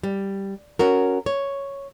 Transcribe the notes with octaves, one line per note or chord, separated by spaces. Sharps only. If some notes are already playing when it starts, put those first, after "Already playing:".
G3
C#4 F#4 A#4
C#5